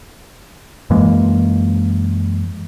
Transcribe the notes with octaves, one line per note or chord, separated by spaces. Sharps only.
F#2 E3 G#3 A#3